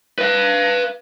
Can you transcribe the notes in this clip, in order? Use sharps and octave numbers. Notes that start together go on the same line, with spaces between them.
B4 F5